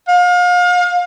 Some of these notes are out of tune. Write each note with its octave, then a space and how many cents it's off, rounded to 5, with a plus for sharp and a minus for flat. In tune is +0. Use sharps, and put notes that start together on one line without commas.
F5 +35